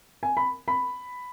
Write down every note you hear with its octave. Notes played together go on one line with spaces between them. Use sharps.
G#5
B5
B5